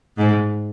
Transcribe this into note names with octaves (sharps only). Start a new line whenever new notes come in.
G#2